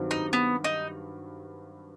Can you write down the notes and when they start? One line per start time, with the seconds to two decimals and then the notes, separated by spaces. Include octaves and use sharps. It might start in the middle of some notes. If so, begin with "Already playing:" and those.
Already playing: G2 D#3 F#3 C4 F#4
0.11 D#4
0.33 B3
0.64 D#4